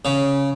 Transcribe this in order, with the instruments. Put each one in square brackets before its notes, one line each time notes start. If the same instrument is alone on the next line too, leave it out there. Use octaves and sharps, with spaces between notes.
[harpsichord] C#3